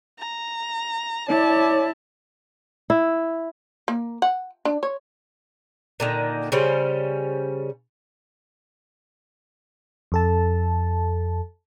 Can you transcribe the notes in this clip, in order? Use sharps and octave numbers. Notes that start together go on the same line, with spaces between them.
A#5
E4 C#5 D5 A5
E4
A#3
F#5
D4
C#5
A#2 D3 D#3
C#3 G3 C#4 C5
F2 A4 A5